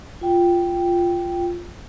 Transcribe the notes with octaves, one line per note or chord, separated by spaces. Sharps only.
F4 G5